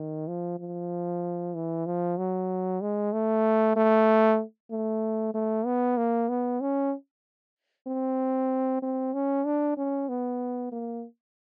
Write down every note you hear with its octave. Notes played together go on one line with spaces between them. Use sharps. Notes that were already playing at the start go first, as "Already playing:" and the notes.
Already playing: D#3
F3
F3
E3
F3
F#3
G#3
A3
A3
A3
A3
B3
A#3
B3
C#4
C4
C4
C#4
D4
C#4
B3
A#3